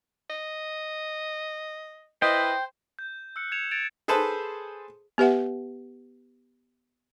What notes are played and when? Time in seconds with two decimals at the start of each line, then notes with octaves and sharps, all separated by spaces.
0.30 D#5
2.22 E4 B4 C5 D#5 G5
2.99 G6
3.36 E6 F#6 C#7
3.51 E6 G#6 C#7 E7 F7
3.71 G#6 A6 C#7 D7 E7 F7
4.08 G#4 A4 B4 C5 A5
5.18 B3 G4 B4 E5 F#5